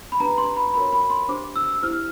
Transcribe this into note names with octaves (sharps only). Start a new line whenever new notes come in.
B5
D4 G4 B4 A#5
C6
B5
F#4 A#4 C#5 B5
B5
C6
D4 G4 C5 D6
E6
E6
E4 G4 C5 F6